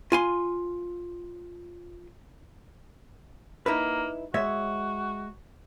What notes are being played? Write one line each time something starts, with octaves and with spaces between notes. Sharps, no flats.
F4 G#5 C6
A#3 D#4 E4 B4
G#3 F#4 C#5 E5